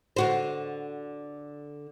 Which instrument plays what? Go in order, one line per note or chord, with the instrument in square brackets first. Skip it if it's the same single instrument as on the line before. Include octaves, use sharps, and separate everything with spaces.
[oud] D3 F#4 C5